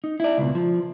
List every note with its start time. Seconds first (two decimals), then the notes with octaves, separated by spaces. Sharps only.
0.04 D#4
0.20 E4 D5
0.38 C#2 B2
0.55 F3